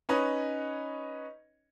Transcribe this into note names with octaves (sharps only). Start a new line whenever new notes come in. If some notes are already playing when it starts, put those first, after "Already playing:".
C#4 D#4 B4 C#5 D#5